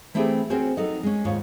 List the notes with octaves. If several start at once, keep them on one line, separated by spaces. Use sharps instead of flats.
E3 A3 C4 E4 G4 G#4
C4 C#4 F#4 G#4 A#4 C5
F#3 D#4 A4 D#5
G#3 C#4
D#2 G#2 D#4 F4 C#5